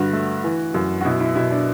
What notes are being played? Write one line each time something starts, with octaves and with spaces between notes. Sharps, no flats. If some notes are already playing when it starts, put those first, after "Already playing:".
Already playing: G2 D3 F#4
A3
E3
F#2
F#4
B2 E4
E4
B2 E4
D4